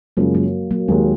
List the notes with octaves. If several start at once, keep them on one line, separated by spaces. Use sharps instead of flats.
F#2 C#3 F3 F#3 G#3 A#3
F#3 A#3
F#3 A#3
D#2 D#3 F#3 G#3